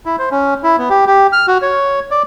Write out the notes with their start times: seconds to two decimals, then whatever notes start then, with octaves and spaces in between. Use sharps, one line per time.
0.06 E4
0.19 C5
0.31 C#4
0.63 E4
0.78 B3
0.90 G4
1.07 G4
1.33 F6
1.48 F#4
1.62 C#5
2.11 D5